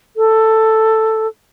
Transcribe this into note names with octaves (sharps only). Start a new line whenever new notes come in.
A4